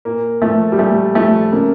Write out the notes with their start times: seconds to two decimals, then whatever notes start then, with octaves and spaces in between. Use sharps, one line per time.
0.05 A#2 A#3
0.42 F3 A3
0.72 G3
0.79 A#2 A3
1.15 F3 A3
1.52 C#3 A#3